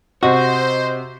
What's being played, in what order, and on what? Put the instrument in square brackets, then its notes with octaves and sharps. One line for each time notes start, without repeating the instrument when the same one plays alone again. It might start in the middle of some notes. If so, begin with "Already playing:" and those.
[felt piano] C3 D#5 [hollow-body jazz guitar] F#4 [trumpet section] C5